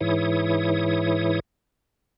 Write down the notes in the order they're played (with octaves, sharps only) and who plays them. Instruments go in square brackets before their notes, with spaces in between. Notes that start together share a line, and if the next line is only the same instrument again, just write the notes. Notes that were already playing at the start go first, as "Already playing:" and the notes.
[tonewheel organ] G#2 E3 E4 C#5 D#6